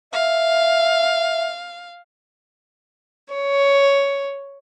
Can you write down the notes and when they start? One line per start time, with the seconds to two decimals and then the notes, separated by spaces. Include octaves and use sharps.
0.13 E5 F5
3.34 C#5